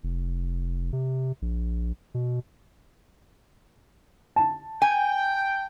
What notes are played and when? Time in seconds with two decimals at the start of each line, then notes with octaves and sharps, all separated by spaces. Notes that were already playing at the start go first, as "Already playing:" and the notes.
0.03 F1
0.93 C3
1.42 A#1
2.14 B2
4.36 A5
4.82 G5 G#5